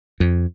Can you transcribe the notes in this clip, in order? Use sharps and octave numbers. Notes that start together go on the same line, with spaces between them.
F2